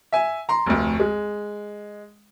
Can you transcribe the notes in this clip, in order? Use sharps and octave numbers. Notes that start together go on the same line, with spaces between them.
E5 G#5
A#5 C6
F1 D2
G#3